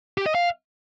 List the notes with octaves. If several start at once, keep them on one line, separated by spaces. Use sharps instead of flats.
G4
D#5
F5